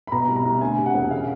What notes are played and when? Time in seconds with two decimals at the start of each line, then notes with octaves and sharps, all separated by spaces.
0.07 B5
0.12 B2 A#5
0.28 C2
0.36 A#5
0.45 C2
0.61 D2 G#5
0.77 C3
0.86 F#5
0.94 E1
1.10 C#3 F5